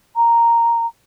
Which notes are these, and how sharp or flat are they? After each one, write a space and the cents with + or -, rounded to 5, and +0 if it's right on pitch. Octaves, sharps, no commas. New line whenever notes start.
A#5 -5